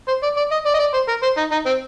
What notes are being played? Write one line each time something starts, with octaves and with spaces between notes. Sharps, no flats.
C5
D5
D5
D#5
D5
D#5
D5
C5
A#4
C5
D#4
D#4
C4